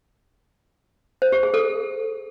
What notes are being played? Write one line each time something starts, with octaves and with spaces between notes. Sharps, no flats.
C5
G4
G#4
A4